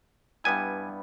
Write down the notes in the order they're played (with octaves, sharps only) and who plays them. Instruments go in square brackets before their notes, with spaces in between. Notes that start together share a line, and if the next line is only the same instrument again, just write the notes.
[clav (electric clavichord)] G2 G3 B3 E4 G#5